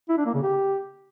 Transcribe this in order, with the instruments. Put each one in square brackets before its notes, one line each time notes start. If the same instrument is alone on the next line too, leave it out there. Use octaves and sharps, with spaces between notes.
[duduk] E4
D4
A#3
C#3
G4